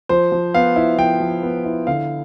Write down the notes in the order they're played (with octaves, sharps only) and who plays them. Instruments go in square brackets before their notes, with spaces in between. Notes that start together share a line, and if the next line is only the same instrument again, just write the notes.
[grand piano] F3 C5
F3
B3 F5
E4
F3 G5
F3
B3
E4
D3 F5